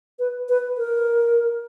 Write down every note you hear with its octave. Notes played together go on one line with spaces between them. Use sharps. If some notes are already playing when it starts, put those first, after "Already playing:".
B4
B4
A#4